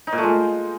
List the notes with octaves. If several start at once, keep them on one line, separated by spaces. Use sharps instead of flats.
D#4
A#2
A3
G#3